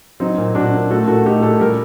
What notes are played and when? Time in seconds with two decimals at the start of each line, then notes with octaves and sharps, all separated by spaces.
0.20 F#3 C4 D#4
0.37 A#2
0.55 A#2 D4 F#4
0.74 A#3
0.91 A3 F#4 A4
1.08 A#2 F#4 A4
1.25 A3 D#4 G4
1.42 A#2 F#4 A4
1.60 G3 G4 A#4